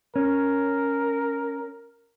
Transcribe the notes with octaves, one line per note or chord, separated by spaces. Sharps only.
C#4 A#4